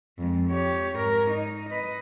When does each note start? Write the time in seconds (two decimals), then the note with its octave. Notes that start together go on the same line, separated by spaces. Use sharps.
0.19 F2 G#3
0.48 G4 C#5
0.95 G#2 A#4
1.31 D#4
1.69 B4 D#5